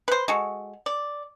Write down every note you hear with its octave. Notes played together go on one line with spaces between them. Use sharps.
B4 C5
G#3 F#4 A4
D5